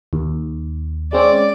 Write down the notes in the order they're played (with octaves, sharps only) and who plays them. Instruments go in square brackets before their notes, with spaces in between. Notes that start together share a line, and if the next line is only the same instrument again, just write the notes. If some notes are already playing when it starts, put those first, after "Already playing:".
[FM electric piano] D#2
[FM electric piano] G#3 C4 C#4 [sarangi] D5